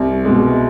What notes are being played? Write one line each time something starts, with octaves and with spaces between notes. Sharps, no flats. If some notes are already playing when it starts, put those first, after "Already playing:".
Already playing: C2
B2 G#3